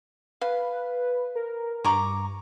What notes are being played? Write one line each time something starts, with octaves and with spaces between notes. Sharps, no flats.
B4 F5
A#4
G2 A#5 C#6 D6